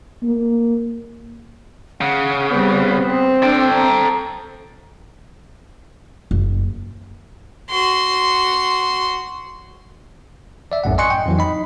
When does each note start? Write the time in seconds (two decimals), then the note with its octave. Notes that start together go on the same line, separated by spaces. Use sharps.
0.23 A#3
2.01 C#3 F#5
2.50 G3 B3 C4
3.05 C4
3.43 D4 A4 G5
3.74 A#5
6.31 F#1
7.70 F#4 C6
10.72 D5 E5
10.84 A#1 F#2 A2 F#5
10.98 D#5 G#5 C6 C#6 F#6 C#7
11.10 G5
11.26 F2 E3 F#3
11.38 D#4 D#5 B5